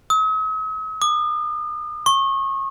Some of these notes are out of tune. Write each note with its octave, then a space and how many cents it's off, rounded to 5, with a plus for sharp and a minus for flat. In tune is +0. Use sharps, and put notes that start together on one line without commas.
D#6 +45
D#6 -40
C#6 -30